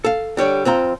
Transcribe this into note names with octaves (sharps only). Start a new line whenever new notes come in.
A4 F5
D3 G3 C#5 D5
F2 C4 F4 A#5